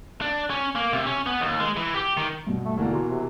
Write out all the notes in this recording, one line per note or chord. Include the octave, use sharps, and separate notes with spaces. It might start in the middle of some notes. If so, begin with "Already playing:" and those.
D4
C#4
A#3
C3
C#4
B3
D#2
G#3
E3
G4
D#3
G2 B2
A3
D#2 B2 D3 E3 A#3
F#4 A#5 C6
C3